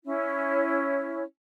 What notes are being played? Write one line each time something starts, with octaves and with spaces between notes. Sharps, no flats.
C#4 E4 C#5